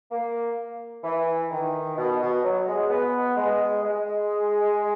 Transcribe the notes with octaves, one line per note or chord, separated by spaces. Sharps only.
A#3
E3
D#3
B2
B2
F#3
G#3
B3
G#3
G#3